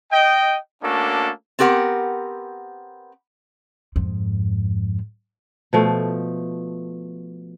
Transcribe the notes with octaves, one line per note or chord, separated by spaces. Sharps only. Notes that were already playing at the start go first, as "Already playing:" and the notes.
D#5 G5
A3 A#3 C#4 D4 F#4 A4
B3 C4 G4 A#4 F#5
F2 G#2
B2 F3 A3